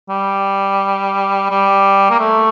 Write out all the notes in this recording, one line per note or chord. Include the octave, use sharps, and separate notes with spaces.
G3
G3
A#3
A3